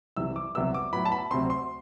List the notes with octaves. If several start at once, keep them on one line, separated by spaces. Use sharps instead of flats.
C2 C3 E3 E6
D6
C2 C3 F#3 B3 E6
D6
A2 F#3 B3 B5
A5
B5
D2 C3 F#3 C4 C6
C6